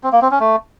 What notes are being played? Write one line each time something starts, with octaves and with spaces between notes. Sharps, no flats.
C4
A#3
C4
C#4
A3